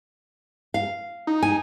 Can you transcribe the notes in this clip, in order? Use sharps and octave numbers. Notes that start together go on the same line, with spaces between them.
F5
D#4
G#5